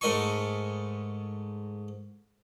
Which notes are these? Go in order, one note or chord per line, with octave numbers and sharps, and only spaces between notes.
G#2 A3 A#4 D#5 G#5 C#6